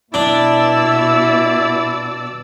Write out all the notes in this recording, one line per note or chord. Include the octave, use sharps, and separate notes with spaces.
B2 D4 E4 D5 E6